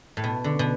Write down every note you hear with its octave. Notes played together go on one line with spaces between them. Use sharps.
A2
B2
D3
B2